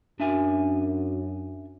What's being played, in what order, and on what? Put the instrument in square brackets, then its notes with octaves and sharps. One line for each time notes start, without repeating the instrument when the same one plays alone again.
[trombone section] F#2 [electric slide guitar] D4 E5 G#5